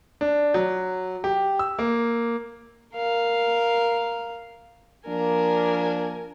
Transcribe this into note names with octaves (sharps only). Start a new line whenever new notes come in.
D4
F#3
G4
E6
A#3
A#4 F5
F3 A#3 D4 A#4 G#5